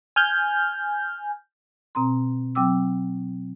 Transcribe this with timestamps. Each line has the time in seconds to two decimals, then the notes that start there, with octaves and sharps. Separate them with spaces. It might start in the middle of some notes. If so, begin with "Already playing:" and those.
0.16 G#5 F6 G6
1.95 B2 C4 A#5 C6
2.55 F#3 C4 G5 D6 E6